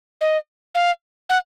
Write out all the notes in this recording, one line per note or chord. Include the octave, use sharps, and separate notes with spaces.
D#5
F5
F#5